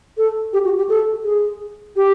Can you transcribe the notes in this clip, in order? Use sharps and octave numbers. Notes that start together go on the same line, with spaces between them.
A4
G4
F#4
G4
A4
G#4
G4